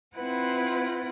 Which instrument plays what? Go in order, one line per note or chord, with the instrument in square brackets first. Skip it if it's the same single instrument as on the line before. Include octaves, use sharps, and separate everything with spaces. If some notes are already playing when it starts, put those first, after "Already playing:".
[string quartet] C4 E4 F4 B4 F#5